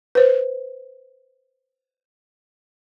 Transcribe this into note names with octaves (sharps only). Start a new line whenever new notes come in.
B4 C5